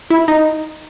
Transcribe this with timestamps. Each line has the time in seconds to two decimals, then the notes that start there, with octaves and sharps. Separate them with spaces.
0.10 E4
0.28 D#4